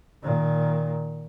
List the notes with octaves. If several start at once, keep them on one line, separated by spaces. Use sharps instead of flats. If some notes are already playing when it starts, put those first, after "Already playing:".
A#2 D#3